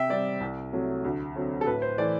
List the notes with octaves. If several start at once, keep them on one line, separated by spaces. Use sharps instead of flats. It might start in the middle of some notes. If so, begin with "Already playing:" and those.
Already playing: C3 E5 G5
G3 C4 D5
C2
C3 F#3 A3
D2
D3 F#3 C4
A4
A2 B4
C5
E3 A3 E4 D5